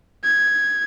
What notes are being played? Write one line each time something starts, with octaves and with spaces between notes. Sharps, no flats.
G#6